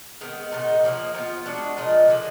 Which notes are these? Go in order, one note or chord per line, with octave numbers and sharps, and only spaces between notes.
D#3 G#3 B3
A#2 G#3 D#4 F#4
F3 A#3 D#4 G#4
F3 B3 F4
G#3 D4 F#4
A#2 F3 G#3 D#4
D3 F3 A#3